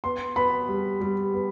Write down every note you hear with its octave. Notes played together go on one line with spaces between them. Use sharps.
B3 C6
B3 B5
G3
G3
B3